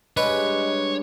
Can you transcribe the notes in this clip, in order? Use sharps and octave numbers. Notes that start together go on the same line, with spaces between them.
G2 G#3 B4 C#5 D#5